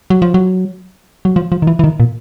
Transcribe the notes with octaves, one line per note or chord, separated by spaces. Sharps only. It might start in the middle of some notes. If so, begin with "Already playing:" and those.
F#3
F3
F#3
F#3
F3
F3
D#3
E3
E3
D#3
A#2